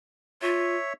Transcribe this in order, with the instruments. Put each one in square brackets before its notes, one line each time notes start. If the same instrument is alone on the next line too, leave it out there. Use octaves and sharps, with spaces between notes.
[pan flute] F4 [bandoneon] C#5 E5